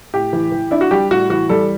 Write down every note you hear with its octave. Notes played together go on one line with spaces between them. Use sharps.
A2 G4
E3
E3
D4 E4
F#4
G3 G4
A2 F#4
E3 F#4
G3 A4